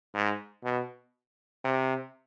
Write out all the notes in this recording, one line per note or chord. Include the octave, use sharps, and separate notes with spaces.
G#2
B2
C3